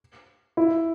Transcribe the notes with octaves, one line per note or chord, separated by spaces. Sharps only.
E4